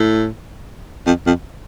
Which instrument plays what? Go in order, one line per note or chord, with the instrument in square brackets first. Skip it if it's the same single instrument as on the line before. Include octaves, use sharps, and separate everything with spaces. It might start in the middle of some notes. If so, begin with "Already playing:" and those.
Already playing: [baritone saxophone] A2
F2
F2